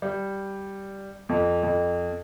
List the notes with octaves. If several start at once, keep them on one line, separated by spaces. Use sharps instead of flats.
G3
F2
F2